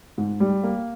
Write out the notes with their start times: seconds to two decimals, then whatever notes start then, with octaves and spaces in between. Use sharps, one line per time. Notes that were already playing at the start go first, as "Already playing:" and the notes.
0.18 G#2
0.40 G3
0.63 A#3